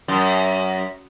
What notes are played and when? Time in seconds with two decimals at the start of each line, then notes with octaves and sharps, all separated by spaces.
0.08 F#2